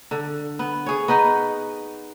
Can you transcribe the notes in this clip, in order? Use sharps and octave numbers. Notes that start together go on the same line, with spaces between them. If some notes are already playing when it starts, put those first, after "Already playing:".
D3
B3
G#4 C#5
B3 D#4 B4 D#5